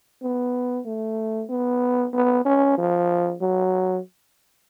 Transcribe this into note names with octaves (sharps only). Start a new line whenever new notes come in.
B3
A3
B3
B3
C#4
F3
F#3